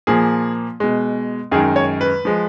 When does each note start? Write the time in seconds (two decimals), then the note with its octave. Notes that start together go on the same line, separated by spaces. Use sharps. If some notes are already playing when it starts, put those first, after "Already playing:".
0.07 A#2 F3 A#3 G#4
0.80 B2 G#3
1.51 F#2 D#3 G#3 G#4
1.76 C#5
2.01 B4
2.25 F3 G#3